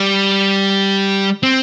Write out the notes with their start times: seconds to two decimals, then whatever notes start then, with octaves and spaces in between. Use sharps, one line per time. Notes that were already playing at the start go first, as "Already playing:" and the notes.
Already playing: G3
1.43 C4